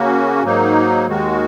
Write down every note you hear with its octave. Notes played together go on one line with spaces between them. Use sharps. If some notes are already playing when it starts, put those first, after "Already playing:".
Already playing: C#3 A#3 C#4 F#4
G#2 F#3 A#3 D#4
D#2 D#3 G#3 F#4